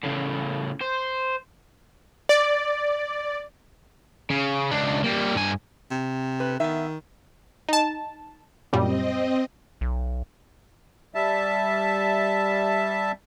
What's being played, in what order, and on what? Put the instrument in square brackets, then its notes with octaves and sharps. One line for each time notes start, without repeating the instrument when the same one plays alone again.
[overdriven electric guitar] A2 C#3
C5
[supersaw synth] D5
[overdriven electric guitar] C#3
C#2 D4
G3 A#3
G2 G#5
[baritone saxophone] C3
[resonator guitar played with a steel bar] B4
[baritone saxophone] D#3 [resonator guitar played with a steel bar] B3 E5
[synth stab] D#4 A5
[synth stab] F#2 A#2 G3 [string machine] C4 D#5
[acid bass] B1
[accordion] G3 E5 A5